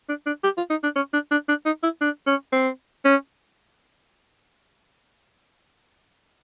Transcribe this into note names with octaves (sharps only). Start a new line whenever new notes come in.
D4
D4
G4
F4
D#4
D4
C#4
D4
D4
D4
D#4
E4
D4
C#4
C4
C#4